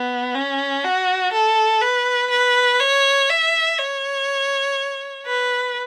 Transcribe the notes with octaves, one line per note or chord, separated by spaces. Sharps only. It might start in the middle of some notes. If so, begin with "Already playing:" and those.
Already playing: B3
C#4
F#4
A4
B4
B4
C#5
E5
C#5
B4